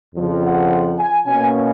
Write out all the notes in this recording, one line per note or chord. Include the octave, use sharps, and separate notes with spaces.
F2 C#3 F3
F#5
G#5
B2 A#3 C#4 G#5